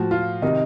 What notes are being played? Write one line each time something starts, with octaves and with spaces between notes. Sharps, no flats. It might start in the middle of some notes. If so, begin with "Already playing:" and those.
Already playing: A2 F3 F#4
F4
C3 D#3 D#4